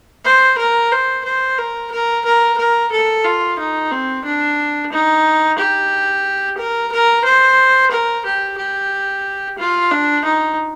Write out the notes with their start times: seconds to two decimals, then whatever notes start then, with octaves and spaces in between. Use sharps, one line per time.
0.25 C5
0.58 A#4
0.92 C5
1.25 C5
1.58 A#4
1.91 A#4
2.25 A#4
2.58 A#4
2.92 A4
3.25 F4
3.59 D#4
3.91 C4
4.24 D4
4.92 D#4
5.59 G4
6.58 A#4
6.92 A#4
7.24 C5
7.91 A#4
8.25 G4
8.58 G4
9.58 F4
9.91 D4
10.25 D#4